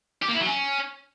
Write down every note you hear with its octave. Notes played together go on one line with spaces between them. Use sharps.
G4
A#3
E4
F#3
C#4